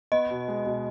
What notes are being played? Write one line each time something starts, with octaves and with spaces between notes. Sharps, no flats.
B3 D#5
B2
G#3
B2